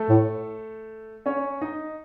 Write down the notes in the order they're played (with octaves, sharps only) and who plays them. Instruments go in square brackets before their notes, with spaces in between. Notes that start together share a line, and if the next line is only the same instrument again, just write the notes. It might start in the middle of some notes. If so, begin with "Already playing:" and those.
Already playing: [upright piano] A3 A4
[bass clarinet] A2
[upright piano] C#4 C#5
D#4 D#5